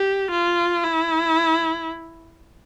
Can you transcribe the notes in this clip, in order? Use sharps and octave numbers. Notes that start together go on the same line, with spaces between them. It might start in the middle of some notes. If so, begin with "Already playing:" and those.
Already playing: G4
F4
E4